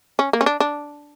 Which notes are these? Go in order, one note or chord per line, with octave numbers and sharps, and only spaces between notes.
C#4
A#3
C#4
D4
D4